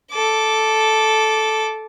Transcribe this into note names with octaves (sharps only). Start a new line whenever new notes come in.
A4 D6